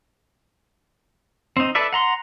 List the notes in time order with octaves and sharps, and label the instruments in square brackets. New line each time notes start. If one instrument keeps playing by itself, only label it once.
[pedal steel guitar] C4 D#4
A4 B4 D5 E5
F#5 A#5 C6